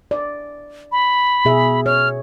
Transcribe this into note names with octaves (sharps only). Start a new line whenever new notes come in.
D5
B5
B2 G#4 E5
C#5 F6